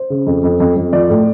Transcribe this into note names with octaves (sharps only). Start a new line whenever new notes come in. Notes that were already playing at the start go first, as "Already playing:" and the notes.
Already playing: C5
C#3
F2
F2
F2
F2
F3 D5
A2